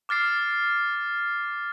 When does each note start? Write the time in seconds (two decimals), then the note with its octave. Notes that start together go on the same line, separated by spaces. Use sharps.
0.09 D6 F6 A6 C7